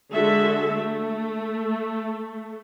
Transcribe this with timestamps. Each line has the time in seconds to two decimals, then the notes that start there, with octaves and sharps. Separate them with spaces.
0.12 D3 G#3 F#4 A4 E5
0.71 A3